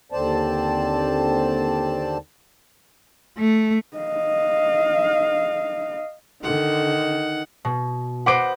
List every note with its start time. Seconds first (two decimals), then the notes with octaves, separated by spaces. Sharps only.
0.12 D#2 D3 C4 C5 D5 A5
3.38 A3
3.97 D#5 F5
6.43 D3 D#3 F#5
7.65 B2
8.26 B4 C5 D#5 F#5 D6 D7